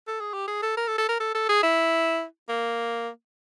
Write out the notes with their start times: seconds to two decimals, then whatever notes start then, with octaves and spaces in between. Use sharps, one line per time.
0.07 A4
0.20 G#4
0.33 G4
0.48 G#4
0.63 A4
0.77 A#4
0.87 A4
0.98 A4
1.08 A#4
1.20 A4
1.34 A4
1.49 G#4
1.63 E4
2.49 A#3